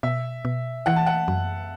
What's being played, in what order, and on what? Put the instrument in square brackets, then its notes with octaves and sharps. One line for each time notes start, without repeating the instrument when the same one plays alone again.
[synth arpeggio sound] B2 [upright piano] E5
[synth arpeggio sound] B2
[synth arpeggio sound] E3 [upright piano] F#5
[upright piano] A5
F#5
[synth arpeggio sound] F#2